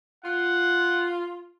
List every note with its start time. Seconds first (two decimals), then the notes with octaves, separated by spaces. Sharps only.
0.24 F4 F#5